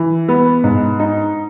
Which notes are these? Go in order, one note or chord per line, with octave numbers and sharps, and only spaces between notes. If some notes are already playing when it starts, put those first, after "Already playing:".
Already playing: E3
B3
G#2
D#4